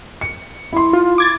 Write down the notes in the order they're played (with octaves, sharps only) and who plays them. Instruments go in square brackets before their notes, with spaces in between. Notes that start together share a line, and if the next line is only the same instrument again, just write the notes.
[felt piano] C#7
E4 C6
[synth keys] F4
D6 G#6 A6